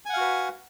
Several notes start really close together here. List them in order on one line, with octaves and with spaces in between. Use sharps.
G#5 F#5 F5 F#4 B4